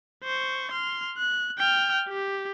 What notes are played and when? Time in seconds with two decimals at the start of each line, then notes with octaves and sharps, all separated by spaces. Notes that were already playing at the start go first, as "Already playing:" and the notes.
0.24 C5 C#6
0.71 C6 F6
1.18 F#6
1.58 G5 F6
2.09 G4